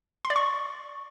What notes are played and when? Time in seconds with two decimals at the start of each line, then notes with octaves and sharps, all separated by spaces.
0.25 C6
0.30 D5
0.36 C#6